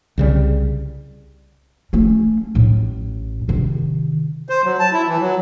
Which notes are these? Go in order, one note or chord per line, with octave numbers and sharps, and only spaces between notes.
C2 C#3 G3
A3 C#4
A1 A2
C3 D#3
C5
F#3
A5
E4
E3
F#3